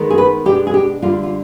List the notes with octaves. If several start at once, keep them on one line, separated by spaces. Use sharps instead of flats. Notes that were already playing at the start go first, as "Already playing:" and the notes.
Already playing: D#3 G#3 B3
G#4
B4
B2 G#3 D4 G4
G#4
G4
D3 G3 D4 F4
F4